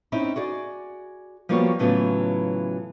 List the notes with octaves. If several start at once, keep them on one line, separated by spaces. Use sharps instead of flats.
C4 C#4 D#4 E4
F#4 G#4 D5
F3 G3 A#3 B3 F#4 C#5
A2 C#3 E3 F#3 B3 F4